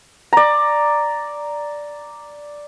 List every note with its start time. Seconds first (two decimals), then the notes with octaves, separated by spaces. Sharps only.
0.33 D5 A#5